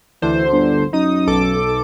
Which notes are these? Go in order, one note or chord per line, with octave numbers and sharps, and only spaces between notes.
D2 D3 E3 C5
G1
F#2 D#4 D#6
B1 A4 D6